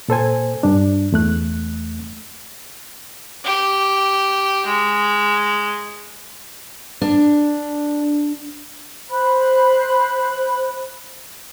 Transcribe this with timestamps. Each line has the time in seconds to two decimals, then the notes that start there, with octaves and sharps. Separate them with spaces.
0.08 A#2 A4 C5 G#5
0.63 G2 D4
1.12 E2 A3 F#6
3.44 G4
4.66 G#3
7.01 D4
9.10 C5 B5 F#6